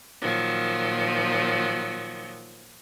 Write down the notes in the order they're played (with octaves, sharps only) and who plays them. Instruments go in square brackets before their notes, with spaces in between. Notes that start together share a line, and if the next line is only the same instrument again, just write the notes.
[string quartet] A#2 D#3 F3 F#3